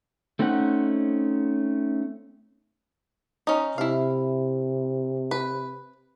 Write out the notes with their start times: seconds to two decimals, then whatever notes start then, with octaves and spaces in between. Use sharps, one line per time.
0.39 A3 C4 C#4 D#4 F#5
3.47 C#4 D#4
3.78 C3 E4 F5
5.31 B4